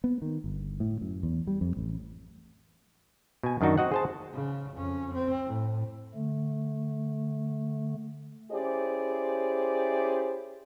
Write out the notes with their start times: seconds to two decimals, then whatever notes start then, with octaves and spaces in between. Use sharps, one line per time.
0.04 B3
0.22 D#3
0.44 G1
0.80 A2
1.01 F#2
1.23 E2
1.47 G3
1.61 F2
1.77 A1
3.43 B2 G#5
3.61 F#2 D#3 D4 D#4 F#4
3.78 C4 F#4 D#5 F#5
3.92 G#4 C5 A5
4.33 C#3
4.73 F2 C#4
5.14 C4
5.46 A2
6.14 D3 A3
8.52 C#4 E4 G4 G#4 C5 D5